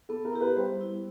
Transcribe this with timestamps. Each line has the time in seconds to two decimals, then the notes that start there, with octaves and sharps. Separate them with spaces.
0.09 B3 A4
0.25 A#4
0.33 E4 G4
0.41 B4
0.56 G3 C5
0.81 B3 E4